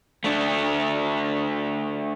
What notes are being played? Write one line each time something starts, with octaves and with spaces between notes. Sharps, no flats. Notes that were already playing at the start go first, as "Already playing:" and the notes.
A3 D4